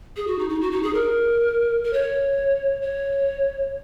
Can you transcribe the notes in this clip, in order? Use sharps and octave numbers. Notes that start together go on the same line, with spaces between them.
G#4
F#4
D#4
D#4
F#4
D#4
G#4
A#4
A#4
C#5
C#5